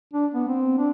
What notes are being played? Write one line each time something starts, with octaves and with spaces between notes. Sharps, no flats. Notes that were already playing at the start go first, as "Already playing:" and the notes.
D4
B3
C4
D4